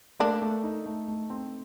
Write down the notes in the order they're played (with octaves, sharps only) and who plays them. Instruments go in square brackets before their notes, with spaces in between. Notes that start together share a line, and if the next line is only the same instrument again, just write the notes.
[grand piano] A3 [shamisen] A#3 D4
[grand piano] A3
D#4
A3
A3
C4